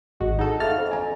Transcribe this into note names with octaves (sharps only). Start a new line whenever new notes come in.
G#1 G#3 F#4
D#4 F#4 G#4 A4
A3 F5 F6 A6
F2
G#5 A#5